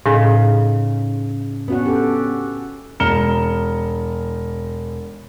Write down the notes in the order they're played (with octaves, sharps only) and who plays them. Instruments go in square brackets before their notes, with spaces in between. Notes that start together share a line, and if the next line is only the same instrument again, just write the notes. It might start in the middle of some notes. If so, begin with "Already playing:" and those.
[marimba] A2 [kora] C#3 [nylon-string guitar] C#4 D#4 G#4
[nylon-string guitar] B3 D4 [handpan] C#4 F#4 F#5
[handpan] G4 A4
[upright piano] E1 A#5 F6 C#7 E7 G7